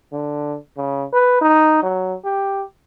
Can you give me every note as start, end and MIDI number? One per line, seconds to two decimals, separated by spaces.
0.12 0.56 50
0.77 1.05 49
1.13 1.39 71
1.42 1.79 63
1.82 2.15 54
2.24 2.63 67